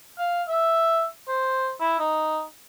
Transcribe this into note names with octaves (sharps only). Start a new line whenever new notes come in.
F5
E5
C5
E4
D#4